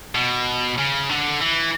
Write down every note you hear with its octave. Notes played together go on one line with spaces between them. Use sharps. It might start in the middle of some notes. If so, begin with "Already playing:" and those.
B2
C#3
D3
E3